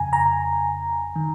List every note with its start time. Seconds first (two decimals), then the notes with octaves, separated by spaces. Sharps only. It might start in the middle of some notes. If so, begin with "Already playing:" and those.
Already playing: F2 C#3 G#5 A#5
0.13 A#5
1.16 D#3